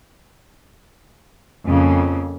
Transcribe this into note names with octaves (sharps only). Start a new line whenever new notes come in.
F2 C#3 A#3